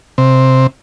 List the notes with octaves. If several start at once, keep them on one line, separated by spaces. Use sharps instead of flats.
C3